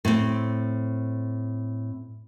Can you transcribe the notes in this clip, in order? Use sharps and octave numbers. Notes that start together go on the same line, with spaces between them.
A2 C4